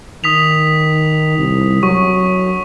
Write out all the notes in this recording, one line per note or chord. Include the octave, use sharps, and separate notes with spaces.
D#3 D#6 B6 F7
C2
F#3 C#6